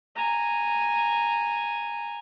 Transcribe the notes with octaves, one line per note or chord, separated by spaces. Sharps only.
G#5 A#5